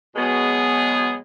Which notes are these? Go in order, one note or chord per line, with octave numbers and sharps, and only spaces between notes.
B2 F#3 G#3 B3 G#4